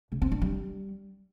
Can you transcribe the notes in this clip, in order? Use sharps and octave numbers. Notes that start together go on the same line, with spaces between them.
C#3
C4
D4
G3